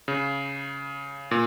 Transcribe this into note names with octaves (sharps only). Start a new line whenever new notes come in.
C#3
A#2